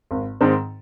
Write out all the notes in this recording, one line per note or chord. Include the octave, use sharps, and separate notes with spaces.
G#1
G#2 D#3 G#3 C4